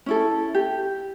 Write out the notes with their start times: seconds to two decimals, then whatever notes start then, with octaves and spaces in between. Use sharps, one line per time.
0.06 C#4 E4 A4
0.55 G4